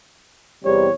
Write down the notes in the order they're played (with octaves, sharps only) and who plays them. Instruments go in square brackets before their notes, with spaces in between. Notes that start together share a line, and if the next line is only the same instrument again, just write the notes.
[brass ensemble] E2 C3 G3 [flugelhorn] C#5